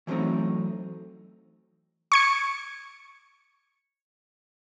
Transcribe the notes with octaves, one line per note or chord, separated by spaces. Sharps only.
E3 F#3 G3 A3 C4 D#4
C#6 G#6 C#7